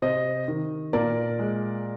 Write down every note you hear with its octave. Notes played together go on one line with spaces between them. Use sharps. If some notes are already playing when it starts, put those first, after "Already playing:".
C3 C5 D#5
D#3
A#2 A#4 D5
G#3